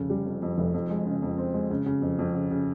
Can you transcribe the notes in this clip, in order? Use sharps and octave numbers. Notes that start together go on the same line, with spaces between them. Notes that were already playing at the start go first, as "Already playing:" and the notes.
Already playing: F1 C#3
G3
F2
F2
F1
F2
G#3
C#3
F2
C4
G#3
C#3
C#3
F2
F2
C#3
C#3